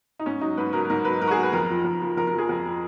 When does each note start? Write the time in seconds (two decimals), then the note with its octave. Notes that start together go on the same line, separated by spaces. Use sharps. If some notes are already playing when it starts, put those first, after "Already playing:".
0.19 D#4
0.26 G#2 C#4
0.41 F#3 D#4
0.57 G#2 B4
0.73 F#3 A#4
0.90 G#2 A#4
1.05 F#3 B4
1.21 G#2 A#4
1.28 F#4
1.31 G#4
1.37 F#3
1.43 B4
1.52 F2 A#4
1.70 F3
1.84 F2
2.02 F3
2.17 F2 A#4
2.27 A#4
2.33 F3 G#4
2.49 F2
2.65 F3